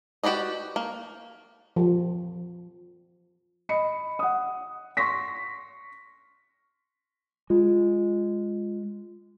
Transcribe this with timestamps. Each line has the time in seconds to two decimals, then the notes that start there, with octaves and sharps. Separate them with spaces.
0.23 F#4 G4 B4 D5 D#5
0.76 A#3
1.76 F3
3.69 D#5 B5 C#7
4.19 F#5 D#6
4.97 C6 C#6 A#6 B6
7.50 G#3 F4